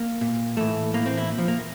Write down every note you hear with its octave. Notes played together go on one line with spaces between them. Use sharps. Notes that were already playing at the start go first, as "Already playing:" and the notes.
Already playing: A#3
A#2
A2 E3 A3
A2 E3 A#3
C4
E4
A#2
F3
A#3